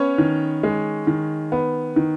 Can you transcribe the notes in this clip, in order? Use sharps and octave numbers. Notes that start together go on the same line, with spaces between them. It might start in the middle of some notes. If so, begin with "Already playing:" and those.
Already playing: B3 C#4 C#5
D#3
G#3
D#3
B3
D#3